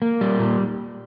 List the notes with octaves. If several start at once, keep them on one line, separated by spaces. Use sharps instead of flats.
A#3
G3
A#2